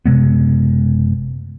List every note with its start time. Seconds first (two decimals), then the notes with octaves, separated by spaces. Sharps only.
0.06 F#1 C3 G#3 B3